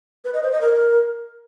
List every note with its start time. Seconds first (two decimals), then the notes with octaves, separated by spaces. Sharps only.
0.25 B4
0.34 D#5
0.43 C5
0.52 D#5
0.61 A#4